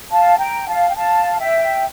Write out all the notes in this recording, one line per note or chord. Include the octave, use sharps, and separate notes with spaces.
F5 A5
G5 A#5
F5 A5
G5
F5 A5
E5 G5